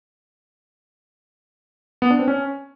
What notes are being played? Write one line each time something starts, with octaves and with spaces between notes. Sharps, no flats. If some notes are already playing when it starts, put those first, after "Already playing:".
B3
D4
C4
C#4